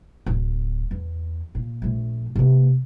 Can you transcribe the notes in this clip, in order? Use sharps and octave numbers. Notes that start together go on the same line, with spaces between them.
D1
E2
A#2
A#1 A3
C3 A#3